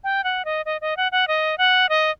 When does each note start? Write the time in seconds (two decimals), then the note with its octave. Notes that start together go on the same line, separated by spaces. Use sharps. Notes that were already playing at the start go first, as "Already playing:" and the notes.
0.04 G5
0.24 F#5
0.45 D#5
0.66 D#5
0.81 D#5
0.97 F#5
1.12 F#5
1.28 D#5
1.58 F#5
1.89 D#5